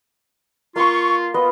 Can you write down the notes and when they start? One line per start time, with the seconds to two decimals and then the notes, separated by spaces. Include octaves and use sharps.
0.76 A#3 F4 C6 C#6
1.34 B3 F4 D#5